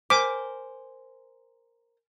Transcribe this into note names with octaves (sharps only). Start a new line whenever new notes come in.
A#4 C5 G#5 D6 F6 B6